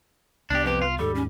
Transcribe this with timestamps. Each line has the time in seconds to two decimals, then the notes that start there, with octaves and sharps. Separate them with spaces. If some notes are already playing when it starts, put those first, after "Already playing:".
0.50 C2 B3 D4 G4 D5
0.65 F2 G4 B4
0.82 F4
0.99 D#2 G#2 G3 A4
1.15 C#4